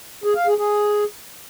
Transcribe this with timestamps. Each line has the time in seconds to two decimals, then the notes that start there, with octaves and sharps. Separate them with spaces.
0.24 G#4
0.35 F5
0.47 G#4
0.58 G#4